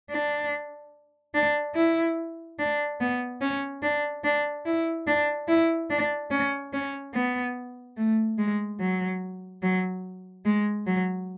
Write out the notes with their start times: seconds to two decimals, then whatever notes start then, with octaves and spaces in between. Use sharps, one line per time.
0.10 D4
1.34 D4
1.75 E4
2.59 D4
3.00 B3
3.41 C#4
3.82 D4
4.24 D4
4.66 E4
5.07 D4
5.48 E4
5.90 D4
6.31 C#4
6.73 C#4
7.14 B3
7.97 A3
8.38 G#3
8.80 F#3
9.62 F#3
10.45 G#3
10.87 F#3